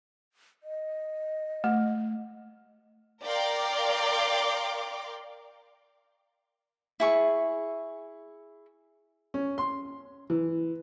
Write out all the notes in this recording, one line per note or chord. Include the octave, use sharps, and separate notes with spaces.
D#5
A3
A#4 D5 F5 G5 C6 D6
E4 G#4 C#6
C#4
C6
E3